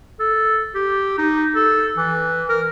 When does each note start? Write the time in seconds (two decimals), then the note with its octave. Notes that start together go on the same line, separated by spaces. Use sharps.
0.20 A4
0.75 G4
1.18 D#4
1.55 A4
1.97 E3
2.49 A#4